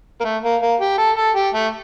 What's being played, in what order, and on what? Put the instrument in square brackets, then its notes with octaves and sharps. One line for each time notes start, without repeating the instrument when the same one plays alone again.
[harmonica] A#3
A3
A#3
A#3
G4
A4
A4
G4
A3